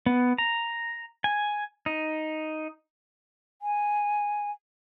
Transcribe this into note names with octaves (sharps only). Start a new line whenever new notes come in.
B3
A#5
G#5
D#4
G#5